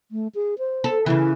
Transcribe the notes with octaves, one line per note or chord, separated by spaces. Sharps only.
A3
G#4
C5
A4
C#3 E3 E4